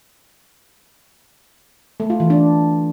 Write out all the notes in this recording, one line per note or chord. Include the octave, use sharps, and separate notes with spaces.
A3
F4
E3
D4